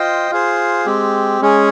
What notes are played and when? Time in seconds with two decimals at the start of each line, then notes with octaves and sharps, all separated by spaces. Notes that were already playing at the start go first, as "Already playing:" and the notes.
Already playing: F4 C5 D#5 G5
0.31 F4 G#4 C5
0.86 G#3 C4 G4
1.41 G#3 C#4 G#4